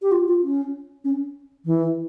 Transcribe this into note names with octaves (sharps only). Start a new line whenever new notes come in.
G4
F4
F4
C#4
C#4
E3